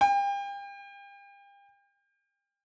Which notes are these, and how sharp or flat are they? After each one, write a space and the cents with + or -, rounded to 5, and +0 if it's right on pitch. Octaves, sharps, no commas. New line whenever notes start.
G5 +35